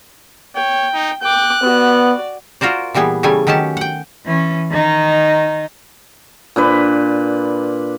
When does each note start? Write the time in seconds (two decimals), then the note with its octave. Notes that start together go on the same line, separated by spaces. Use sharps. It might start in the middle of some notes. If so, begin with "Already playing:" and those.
0.55 C#5 G5
0.94 D#4
1.23 G5 D6 F#6
1.63 B3 F#4 D5
2.61 F4 F#4 A#4 C5 D5
2.94 A#2 E3 G3 B3 G#4
3.23 C#3 E3 G3 A3 G#5
3.47 D#3 F#3 C#4 G4 A5
3.77 F#5 G5
4.26 E3 C#4
4.70 D#3 D#4
6.56 A#2 D4 B4